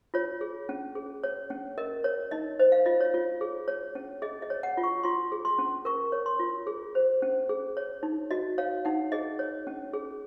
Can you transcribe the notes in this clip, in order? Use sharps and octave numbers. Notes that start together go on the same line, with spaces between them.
F4 C#5
G#4
C#4
G#4
C#5
C#4
A#4 D#5
C#5
D#4 D#5
C5 D#5
F5
F4 D#5
C#5
F4
G#4
C#5
C#4
G#4 D#5
D#5
C#5
F#5
F4
C#6
F4 C6
G#4
C6
C#4
A#4 C#6
C#5
C6
F4
G#4
C5
C#4
G#4
C#5
D#4
F#4 D#5
C#5 F5
D#4 F#5
G#4 D#5
C#5
C#4
G#4